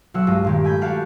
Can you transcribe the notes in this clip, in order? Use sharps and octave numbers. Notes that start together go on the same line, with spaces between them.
B1 F#3 F#5 E6
G2 G#3 F4
A#2 D#3 G4
A3 G#5 B5 G6
F#4 G4 F5 F#5 A5 F#6